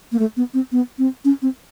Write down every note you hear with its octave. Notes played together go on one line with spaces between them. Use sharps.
A#3
A3
B3
C4
B3
C4
C#4
C4